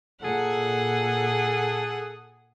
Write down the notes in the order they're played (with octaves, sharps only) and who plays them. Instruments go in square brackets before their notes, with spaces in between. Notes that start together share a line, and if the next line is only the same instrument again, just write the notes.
[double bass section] A#2 [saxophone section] G#4 A4 [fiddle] F#5